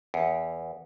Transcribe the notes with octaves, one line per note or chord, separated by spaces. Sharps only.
E2